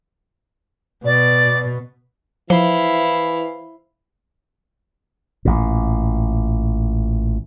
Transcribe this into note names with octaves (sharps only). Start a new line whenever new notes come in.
B2 D5
E3 F3 E4 C5 F5
A1 A#2